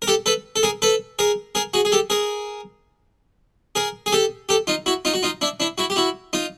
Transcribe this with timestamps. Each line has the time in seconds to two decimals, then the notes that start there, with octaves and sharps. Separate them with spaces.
0.02 A#4
0.07 G4 A4
0.26 A4 B4
0.56 A4
0.63 G#4 A#4
0.82 A4 B4
1.19 G#4 A#4
1.55 G#4 A#4
1.74 F#4 G#4
1.85 G#4
1.92 G4 A4
2.10 G#4 A#4
3.75 G#4 A#4
4.06 G#4
4.12 G4 A4
4.49 G4 A4
4.67 D#4 F4
4.86 E4 F#4
5.05 D#4 F4
5.14 F#4
5.23 D#4 F4
5.41 D4 E4
5.60 D4 E4
5.78 E4 F#4
5.90 G4
5.96 E4 F#4
6.33 D#4 F4